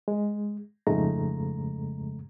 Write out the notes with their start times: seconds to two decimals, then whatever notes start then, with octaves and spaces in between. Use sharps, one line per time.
0.08 G#3
0.87 F2 G#2 C#3 G#3 A3 A#5